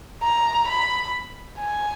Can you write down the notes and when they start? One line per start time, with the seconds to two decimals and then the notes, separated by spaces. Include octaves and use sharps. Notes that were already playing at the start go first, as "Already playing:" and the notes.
0.23 A#5
0.68 B5
1.59 G#5